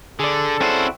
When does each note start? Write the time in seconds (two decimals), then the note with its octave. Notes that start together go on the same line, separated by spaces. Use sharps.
0.19 D3 G#4 A4 D5
0.61 C4 C#4 E4 F#4 C5